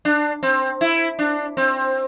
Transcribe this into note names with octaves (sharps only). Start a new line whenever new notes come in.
D4
C4
E4
D4
C4